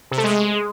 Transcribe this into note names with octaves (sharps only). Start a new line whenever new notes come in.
C3
A3
G#3